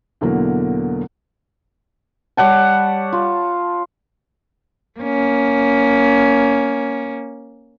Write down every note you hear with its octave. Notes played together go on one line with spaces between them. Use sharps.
E2 B2 D3 E3 F#3 A#3
G3 C#5 F#5 A5
F4
A#3 C#4